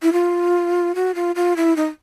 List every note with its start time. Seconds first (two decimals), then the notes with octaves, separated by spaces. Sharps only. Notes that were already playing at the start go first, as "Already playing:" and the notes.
0.02 E4
0.13 F4
0.95 F#4
1.15 F4
1.36 F4
1.56 E4
1.76 D#4